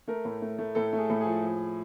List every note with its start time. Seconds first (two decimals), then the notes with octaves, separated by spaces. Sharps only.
0.08 A3 A#4
0.25 A2
0.42 A3
0.58 A3
0.75 A2 A4
0.93 A3 G#4
1.10 A2
1.21 F3 G#4
1.43 F3